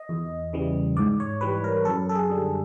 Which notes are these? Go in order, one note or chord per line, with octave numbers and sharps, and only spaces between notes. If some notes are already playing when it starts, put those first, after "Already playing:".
Already playing: D#5
E2
C#3 E3 G3
G#2 D5
C#5
E3 G3 B4
A#4
F#2 A4
A4
G#4
D3 G3